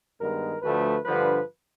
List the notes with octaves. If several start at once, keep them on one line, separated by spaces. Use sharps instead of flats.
G2 D#3 G#3 B3 A#4
D2 D3 F3 A3 B4
G2 D3 F3 B4